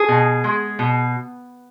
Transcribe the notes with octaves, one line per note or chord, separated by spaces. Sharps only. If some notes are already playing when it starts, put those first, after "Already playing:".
Already playing: G#4
B2
G#3
B2